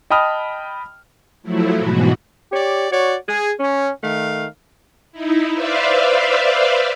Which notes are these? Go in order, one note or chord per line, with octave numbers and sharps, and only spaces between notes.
D#5 G5 A5 B5 D#6 F6
F3 F#3 A3 E4
G#2 B2 E3 F#4
G4 C#5 D5
F#4 C#5 D5
G#4
C#4
D#3 A3 F5
D#4 E4
B4 C5 D5 E5 F5